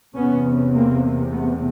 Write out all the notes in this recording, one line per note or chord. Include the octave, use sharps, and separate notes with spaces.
E2 C3 B3 C#4
A#3 C4
A3 B3